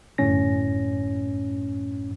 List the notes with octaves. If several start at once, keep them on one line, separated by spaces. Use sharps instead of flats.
G1 F#2 A2 C#4 A#6